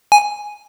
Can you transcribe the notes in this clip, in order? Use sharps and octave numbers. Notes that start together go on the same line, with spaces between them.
G#5